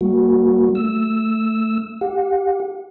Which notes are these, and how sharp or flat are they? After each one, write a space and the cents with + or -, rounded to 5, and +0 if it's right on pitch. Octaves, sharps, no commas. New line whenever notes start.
G3 -20 A#3 +0 F#4 +0
A3 +10 E6 -10
G4 +0 F#5 -40